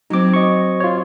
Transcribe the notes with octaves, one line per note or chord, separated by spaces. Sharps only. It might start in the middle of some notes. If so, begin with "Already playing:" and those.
F#3 C4 D#4 D6
D#5 C#6
F4 C#5